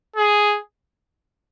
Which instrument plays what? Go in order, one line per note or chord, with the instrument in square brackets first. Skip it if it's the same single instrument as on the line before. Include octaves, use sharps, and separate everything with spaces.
[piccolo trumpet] G#4